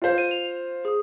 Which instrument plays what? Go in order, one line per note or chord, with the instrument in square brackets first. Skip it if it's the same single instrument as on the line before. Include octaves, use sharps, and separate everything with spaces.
[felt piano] F4 C5
[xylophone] D#7
F7
G#4 D#6